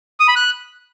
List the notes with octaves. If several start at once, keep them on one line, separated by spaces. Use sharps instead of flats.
D#6
B5
F#6